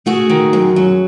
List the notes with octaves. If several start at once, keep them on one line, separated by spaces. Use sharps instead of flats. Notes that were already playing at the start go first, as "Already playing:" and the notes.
A3 F#4 G#4
D#3
F#2
F#3